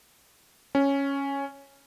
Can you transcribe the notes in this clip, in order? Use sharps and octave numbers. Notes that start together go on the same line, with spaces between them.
C#4